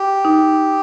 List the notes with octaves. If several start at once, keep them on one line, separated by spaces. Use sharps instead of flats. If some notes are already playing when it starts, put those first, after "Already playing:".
Already playing: G4
D#4